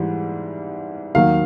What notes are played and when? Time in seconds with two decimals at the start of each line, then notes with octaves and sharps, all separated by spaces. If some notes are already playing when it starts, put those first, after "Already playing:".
Already playing: G#2 E3 G3
1.15 D#2 D#3 F#3 F5